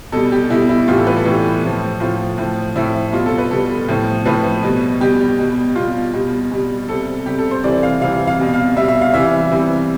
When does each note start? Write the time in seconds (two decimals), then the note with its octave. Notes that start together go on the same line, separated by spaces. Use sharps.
0.12 B2 G3 A4
0.32 G4
0.50 B2 G3 E4
0.69 E4
0.88 A2 E3 G3 F4
0.97 A4
1.07 B4
1.16 A4
1.25 A2 E3 G3
1.63 A2 F3
2.00 A2 F3 F4
2.38 A2 F3
2.76 A2 F3 E4
3.13 B2 G3 F4
3.26 A4
3.38 B4
3.51 B2 G3 A4
3.89 A2 F3
4.26 A2 F3 B4
4.63 B2 G3
5.01 B2 G3 G4
5.39 B2 G3
5.76 B2 G3 F4
6.14 B2 G3
6.52 B2 G3
6.88 C3 G3 A4
7.26 C3 G3 G4
7.39 A4
7.51 C5
7.64 C3 E3 G3 D5
7.83 F5
8.01 C3 E3 G3 F5
8.27 F5
8.39 B2 G3
8.53 F5
8.76 B2 G3 E5
8.88 E5
9.01 F5
9.14 C3 E3 G3 E5
9.51 C3 E3 G3